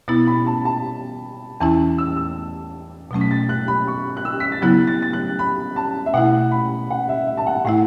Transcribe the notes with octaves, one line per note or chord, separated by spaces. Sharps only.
B2 B3 E4 A6
B5
A5
A5
E2 E3 C#4 E4 A5
E6
E6
B2 F#3 A3 C#4
B6
A6
F#6
B5
C#6
F#6
E6
B6
A6
C#3 F#3 B3 E4 F#6
A6
A6
F#6
B5
A5
E5
B2 A3 E4 F#5
B5
F#5
E5
E5
A5
F#5
A2 A3 E4 F#5